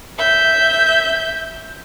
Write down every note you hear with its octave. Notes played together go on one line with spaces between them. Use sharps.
E5 G6